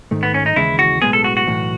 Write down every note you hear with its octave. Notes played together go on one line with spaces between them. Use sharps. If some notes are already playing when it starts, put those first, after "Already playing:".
G#2 D#3 A3
B3
C#4
D#4
D#2 C#3 E3 G#3 E4
F#4
B1 A2 G#3 B3 G#4
A4
F#4
F#4
B1 A2 E3